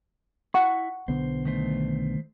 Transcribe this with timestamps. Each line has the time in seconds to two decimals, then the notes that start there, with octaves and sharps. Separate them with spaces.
0.54 E4 F#5 C#6
1.08 B1 D3 B3 C5
1.45 D#3 A3 C5